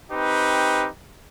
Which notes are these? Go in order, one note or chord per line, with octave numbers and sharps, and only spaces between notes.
C4 D#4 G4 B4